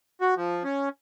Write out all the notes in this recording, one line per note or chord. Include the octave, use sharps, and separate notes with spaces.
F#4
F3
C#4